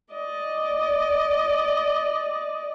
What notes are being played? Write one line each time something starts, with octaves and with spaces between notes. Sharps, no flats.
D5 D#5